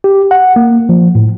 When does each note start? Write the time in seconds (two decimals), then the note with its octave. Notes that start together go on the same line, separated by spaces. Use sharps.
0.04 G4
0.31 F#5
0.56 A#3
0.89 F3
1.15 A2